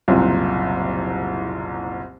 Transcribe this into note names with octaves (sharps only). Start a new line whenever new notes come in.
F#1 C2 A#2